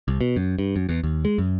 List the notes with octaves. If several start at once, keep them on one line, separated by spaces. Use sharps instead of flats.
C2
B2
F#2
G2
F#2
E2
D#2
G#3
F#2